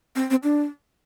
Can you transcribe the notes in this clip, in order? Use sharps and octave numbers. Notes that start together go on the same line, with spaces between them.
C4
C4
D4